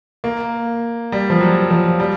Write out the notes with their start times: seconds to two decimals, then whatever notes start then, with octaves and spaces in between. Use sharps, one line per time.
0.24 A#3
1.12 G3
1.30 F3
1.41 F#3
1.70 F3
2.00 G3